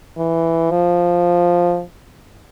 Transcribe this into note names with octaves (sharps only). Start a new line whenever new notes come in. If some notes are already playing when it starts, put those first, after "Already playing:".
E3
F3